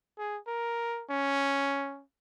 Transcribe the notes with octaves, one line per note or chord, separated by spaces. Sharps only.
G#4
A#4
C#4